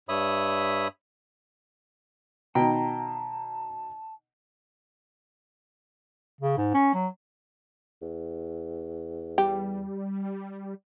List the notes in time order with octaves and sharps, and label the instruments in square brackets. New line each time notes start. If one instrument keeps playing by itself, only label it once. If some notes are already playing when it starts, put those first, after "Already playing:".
[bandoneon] G2 C#5 E5 B5 D#6
[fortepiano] B2 D#3 [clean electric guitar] G5 [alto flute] A5 [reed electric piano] A#5
[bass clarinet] C#3
G#2
C#4
F#3
[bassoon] E2
[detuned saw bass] G3 [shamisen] G4